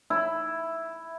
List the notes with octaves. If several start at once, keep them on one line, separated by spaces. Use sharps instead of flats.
E4